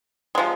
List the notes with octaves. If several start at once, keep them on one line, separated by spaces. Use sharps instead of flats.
C3 F3 G#3